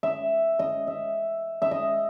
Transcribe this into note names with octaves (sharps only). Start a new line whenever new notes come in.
E5
D#5
E5
E5
D#5